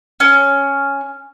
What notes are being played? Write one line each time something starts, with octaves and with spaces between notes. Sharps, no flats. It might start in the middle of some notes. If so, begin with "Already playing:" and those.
C#4